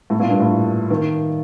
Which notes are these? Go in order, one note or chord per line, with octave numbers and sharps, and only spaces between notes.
A2
A#2
G2
A2
D#3